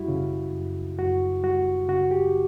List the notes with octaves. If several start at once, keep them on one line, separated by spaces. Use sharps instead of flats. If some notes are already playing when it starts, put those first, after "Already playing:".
Already playing: F#2 G3 E4 F#4
C#3
F#2
F#2 F#4
G3 F#4
C#3 F#4
G4